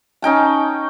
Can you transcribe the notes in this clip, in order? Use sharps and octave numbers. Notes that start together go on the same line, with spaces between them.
C#4 D#4 G5 A5